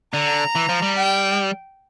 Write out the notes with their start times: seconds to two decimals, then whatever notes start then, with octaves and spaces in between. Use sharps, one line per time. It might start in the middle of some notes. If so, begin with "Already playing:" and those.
0.13 D3 A#5
0.55 E3
0.69 F3
0.82 G3
0.96 G5